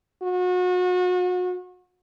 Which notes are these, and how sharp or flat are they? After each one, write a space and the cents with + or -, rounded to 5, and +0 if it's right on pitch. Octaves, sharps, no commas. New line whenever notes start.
F#4 -35